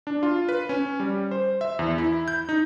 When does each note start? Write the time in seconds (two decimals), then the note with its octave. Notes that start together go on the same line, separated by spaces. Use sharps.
0.07 D4
0.23 F4
0.49 B4
0.69 C#4
1.00 G3
1.31 C5
1.61 E5
1.79 E2
1.98 E4
2.28 G6
2.49 D#4